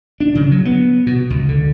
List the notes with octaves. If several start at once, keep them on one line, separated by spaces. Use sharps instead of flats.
D4
C#3
F#3
B3
B2
C#2
D3